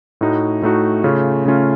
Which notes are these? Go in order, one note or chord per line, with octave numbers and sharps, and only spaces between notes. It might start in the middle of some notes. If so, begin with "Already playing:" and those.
A2 A3 D#4 F#4
A2 A3 D#4 F#4
C#3 A3 C#4 F4
C#3 A3 C#4 F4